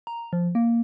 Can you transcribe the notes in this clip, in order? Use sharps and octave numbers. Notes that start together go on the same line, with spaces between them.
A#5
F3
A#3